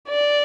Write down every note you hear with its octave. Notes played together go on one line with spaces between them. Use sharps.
D5